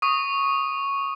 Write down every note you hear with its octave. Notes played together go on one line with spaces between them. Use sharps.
C#6 D#6